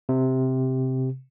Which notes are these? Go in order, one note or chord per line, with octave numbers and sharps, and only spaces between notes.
C3